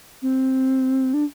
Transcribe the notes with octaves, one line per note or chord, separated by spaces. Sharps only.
C4
D4